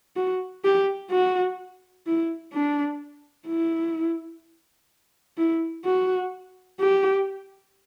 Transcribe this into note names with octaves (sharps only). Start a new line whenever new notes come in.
F#4
G4
F#4
E4
D4
E4
E4
F#4
G4